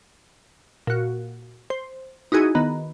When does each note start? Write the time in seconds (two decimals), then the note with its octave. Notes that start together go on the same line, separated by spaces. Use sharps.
0.87 A#2 F#4
1.70 C5
2.32 D#4 E4 F#4 G#4
2.55 D#3 B3